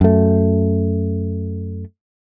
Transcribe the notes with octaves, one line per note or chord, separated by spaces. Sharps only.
F#2 A3